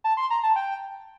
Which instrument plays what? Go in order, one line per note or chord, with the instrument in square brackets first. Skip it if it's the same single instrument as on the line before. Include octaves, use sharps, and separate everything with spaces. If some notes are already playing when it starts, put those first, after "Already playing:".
[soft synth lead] A5
C6
A#5
A5
G5